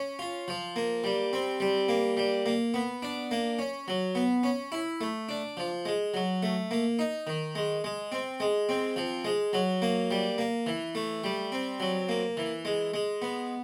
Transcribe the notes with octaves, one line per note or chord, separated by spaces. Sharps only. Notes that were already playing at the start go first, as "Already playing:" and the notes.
Already playing: C#4
F4
F3
A#3
G3
C4
G3
A#3
G3
A#3
B3
D4
A#3
C#4
F#3
B3
C#4
E4
A3
D4
F3
G#3
F#3
A3
A#3
D#4
D#3
G#3
G#3
C4
G#3
C4
F3
G#3
F#3
A#3
G3
A#3
E3
A3
G3
C4
F#3
A#3
E3
G#3
G#3
B3